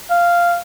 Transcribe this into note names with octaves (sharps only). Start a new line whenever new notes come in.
F5